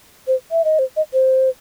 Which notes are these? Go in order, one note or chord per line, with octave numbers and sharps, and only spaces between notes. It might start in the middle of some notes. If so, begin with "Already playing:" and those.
C5
E5
D#5
C5
D#5
C5